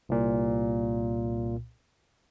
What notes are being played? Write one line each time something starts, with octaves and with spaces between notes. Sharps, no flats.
C2 A#2